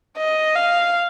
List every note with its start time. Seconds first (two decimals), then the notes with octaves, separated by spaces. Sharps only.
0.17 D#5
0.56 F5